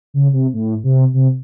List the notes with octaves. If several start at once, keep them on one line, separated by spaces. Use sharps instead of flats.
C#3
C3
A2
C3
C3